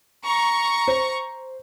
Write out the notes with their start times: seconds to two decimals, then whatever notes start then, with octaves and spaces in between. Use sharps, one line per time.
0.25 A#5 C#6
0.88 C5